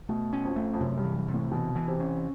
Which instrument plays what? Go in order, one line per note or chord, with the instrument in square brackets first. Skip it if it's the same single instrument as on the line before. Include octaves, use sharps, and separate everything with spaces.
[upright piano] B2 [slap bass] A3
[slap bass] C#4
[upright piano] F2
[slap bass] A3
[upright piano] F2
[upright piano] F#2 [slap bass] C3
[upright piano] G2
[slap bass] E3
[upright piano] G2
[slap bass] C3
[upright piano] A2
[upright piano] B2 [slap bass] E3
[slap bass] E3
[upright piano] C3
[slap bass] C#4